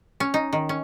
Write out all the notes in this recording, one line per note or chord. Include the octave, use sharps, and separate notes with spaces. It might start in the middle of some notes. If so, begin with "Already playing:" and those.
C#4
D#4
D#3
C#4